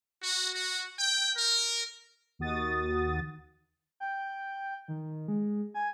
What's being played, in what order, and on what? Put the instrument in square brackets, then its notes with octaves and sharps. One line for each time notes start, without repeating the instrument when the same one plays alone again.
[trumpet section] F#4
F#4
G5
A#4
[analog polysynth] D#2 D#3 F#4 D#6 A6
[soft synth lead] G5
D#3
G#3
G#5